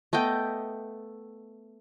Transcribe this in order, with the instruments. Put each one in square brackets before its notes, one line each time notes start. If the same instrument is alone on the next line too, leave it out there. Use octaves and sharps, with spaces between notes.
[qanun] A3 B3 D#5 G5